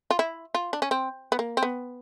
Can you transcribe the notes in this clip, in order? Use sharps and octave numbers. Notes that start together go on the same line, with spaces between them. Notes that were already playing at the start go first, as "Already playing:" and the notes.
F4
E4
F4
D4
C#4
C4
B3
A#3
C4
B3